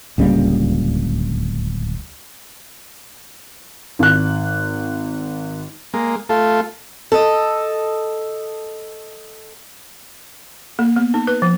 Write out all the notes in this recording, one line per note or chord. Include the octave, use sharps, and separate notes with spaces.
D1 C#2 G3 A#3
G#1 F#6
G#3 A#3
A3 F4 A4
A4 D#5
A#3
B3
D#4
B4
F3